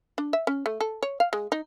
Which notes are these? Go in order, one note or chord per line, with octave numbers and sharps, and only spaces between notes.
D4
E5
C#4
A3
A4
C#5
F5
G#3
D#4